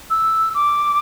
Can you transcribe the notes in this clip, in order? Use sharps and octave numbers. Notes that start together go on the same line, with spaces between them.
E6
D6